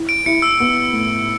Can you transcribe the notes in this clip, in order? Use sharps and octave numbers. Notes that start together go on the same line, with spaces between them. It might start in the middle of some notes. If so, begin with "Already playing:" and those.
Already playing: E4
D7
E4 C#7
E6
B3
A2